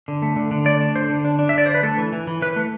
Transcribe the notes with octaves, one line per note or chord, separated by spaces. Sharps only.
D3
A3
D3
D3
A3 D5
D4
D3 C5
D3
D4
D4
E5
D3 D5
D4 C5
B4
A3 A4
E3
E3
E3
E3 B4
A3